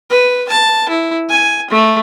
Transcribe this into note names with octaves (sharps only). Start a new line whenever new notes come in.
B4
A5
E4
G#5
A3